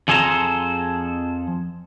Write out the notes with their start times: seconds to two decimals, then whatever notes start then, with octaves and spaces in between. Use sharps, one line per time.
0.08 F2 F3 G#4 A4 C5 A#5